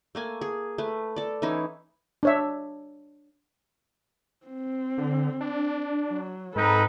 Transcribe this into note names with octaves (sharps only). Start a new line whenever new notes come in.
A3 A#3 G#5
G#4
A3 B4
A4 D5
E3 C#4 D#4 E4
D4 C#5 E5
C4
D3
D4
F#3
G#2 C4 D#4 A4 B4 A#5